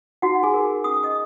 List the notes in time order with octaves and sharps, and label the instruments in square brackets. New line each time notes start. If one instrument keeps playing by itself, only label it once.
[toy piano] D#4 F#4 F#5
G#4 G#5
A#4
C#4 D#6
D#5 D#6